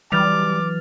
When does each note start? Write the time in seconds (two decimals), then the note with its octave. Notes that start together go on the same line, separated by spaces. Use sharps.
0.12 E3 F#3 G3 D6 F6 A6 F7